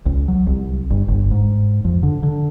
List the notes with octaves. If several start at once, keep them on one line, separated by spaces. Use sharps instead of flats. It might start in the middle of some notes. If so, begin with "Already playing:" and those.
C#2
F#3
C2
G1
G1
G#2
F2
D3
D3